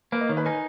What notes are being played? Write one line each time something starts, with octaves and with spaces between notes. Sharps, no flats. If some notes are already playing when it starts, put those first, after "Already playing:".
A#3 B4
D#5
D#3 C#5
B4
D#4 G#5